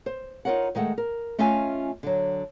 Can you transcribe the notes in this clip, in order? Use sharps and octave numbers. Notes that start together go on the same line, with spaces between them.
C5
D#4 F4 F#4 A#4 C#5 F#5
D#3 G#3 A3 F#5
A#4
A3 C#4 F4 D#5 E5 G#5
D3 F#3